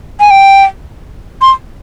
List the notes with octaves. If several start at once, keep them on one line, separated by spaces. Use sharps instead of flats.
G#5
G5
C6